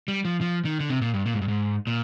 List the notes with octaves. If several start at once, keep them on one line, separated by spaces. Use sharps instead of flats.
G3
F3
F3
D#3
D3
C3
A#2
G2
A#2
G#2
G2
G#2
A#2